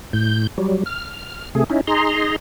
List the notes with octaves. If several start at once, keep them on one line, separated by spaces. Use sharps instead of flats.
A2 G6
F#3 G3
F6
C3 A3 G#4
C#4 D#4 E4
D#4 G#4 A#5 C6